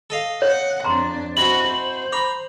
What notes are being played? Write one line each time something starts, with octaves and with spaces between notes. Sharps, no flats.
A4 D#5 F5
C#5 F#5
F2 D4 A#5 C6
B2 C4 E4 F#4 F#7
C5
A#5 B5 D6